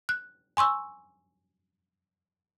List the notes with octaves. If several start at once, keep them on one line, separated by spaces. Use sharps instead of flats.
F#6
G#5 C6 C#6 E6